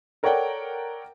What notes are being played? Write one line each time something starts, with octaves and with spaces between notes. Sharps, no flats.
A4 A#4 C#5 D5 F#5 G5